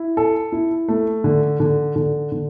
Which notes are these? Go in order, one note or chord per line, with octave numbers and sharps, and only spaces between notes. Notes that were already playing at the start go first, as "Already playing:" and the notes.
Already playing: E4
A4
E4
A3
D3
D3
D3
D3